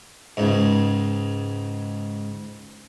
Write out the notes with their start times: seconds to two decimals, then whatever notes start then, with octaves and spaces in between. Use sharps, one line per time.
0.37 C#2 G#2